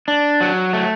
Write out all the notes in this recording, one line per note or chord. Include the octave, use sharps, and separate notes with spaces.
D4
F#3
A3